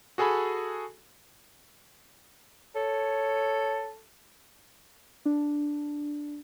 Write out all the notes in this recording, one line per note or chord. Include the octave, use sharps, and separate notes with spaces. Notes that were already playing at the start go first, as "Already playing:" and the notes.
F#4 G#4 A4 G#5 B5
A4 C#5
D4